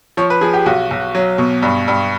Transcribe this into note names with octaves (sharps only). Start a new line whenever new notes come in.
F3 C#5
B4
F3 G#4
G4
B1 F#4
B1
F#3
B2
G2
G2